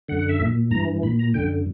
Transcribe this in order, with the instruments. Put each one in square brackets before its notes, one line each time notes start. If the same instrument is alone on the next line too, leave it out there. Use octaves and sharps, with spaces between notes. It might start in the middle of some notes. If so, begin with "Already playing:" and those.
[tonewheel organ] F#2 D3 F#5
F#5
E5
A#2
G2 E3 A#5
A#2 B5
A#5
F#2 D3 G5